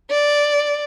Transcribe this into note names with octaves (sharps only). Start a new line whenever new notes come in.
D5